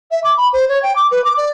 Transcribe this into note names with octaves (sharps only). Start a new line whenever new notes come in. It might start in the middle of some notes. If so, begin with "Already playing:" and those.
E5
D6
B5
C5
C#5
G5
D6
B4
D6
D5